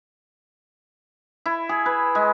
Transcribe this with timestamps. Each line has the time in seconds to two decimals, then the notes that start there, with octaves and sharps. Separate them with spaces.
1.46 E4
1.69 G#4
1.86 B4
2.15 G#3